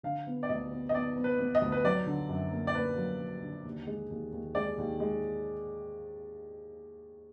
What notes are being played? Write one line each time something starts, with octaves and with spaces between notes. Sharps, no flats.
D3 F5
B3
D5
D2 D#5
B3
D#5
B3 D5
B3
B4
B3
D#5
D2
B4
F#3 D5
D3
F#2
A#3
D5
A#3 B4
F#3
F#3
D3
D#2
G#3
D#2
D#2
G#3 D5
D#2
G#3